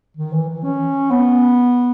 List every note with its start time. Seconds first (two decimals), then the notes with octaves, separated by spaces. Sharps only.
0.17 D#3
0.33 E3
0.49 E3
0.64 C#4
1.11 B3